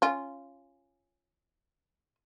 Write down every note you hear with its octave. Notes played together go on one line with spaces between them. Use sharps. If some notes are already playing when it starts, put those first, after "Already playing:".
C#4 F4